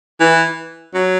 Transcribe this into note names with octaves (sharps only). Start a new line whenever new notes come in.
E3
F#3